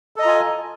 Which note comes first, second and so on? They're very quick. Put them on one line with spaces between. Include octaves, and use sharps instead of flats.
A4 D#5 A#5 F4 G#5